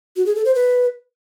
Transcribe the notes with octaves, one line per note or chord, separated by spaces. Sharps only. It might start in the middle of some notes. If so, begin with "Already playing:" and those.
F#4
G#4
A4
C5
B4